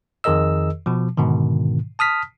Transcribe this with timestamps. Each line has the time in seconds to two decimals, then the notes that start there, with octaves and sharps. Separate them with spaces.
0.24 F2 D#3 G#4 A#4 D#5 E6
0.86 B2 F3
1.17 G#2 B2 D3 D#3
1.99 A5 D#6 F6 B6